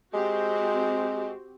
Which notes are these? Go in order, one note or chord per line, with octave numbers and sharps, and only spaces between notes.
G#3 C4 F#4 G4